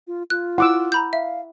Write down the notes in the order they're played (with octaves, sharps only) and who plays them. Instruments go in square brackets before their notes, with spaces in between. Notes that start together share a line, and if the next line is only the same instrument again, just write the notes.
[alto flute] F4
[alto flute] F4 [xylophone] F#6
[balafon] E4 [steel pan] F#5 D6 E6
[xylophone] A#5 B5 G6
[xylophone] E5 [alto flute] F5